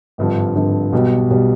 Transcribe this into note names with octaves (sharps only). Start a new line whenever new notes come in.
G#1 G2 D3 F3
G#1 G2 D3 F3
B1 B2 G3
B1 B2 G3